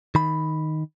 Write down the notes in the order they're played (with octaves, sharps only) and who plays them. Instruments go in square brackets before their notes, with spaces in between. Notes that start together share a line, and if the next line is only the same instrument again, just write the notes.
[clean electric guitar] D#3 B5